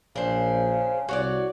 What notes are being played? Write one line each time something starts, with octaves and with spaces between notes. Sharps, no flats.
A#1 C#3 D4 C5
C2 F#4 C#5 D5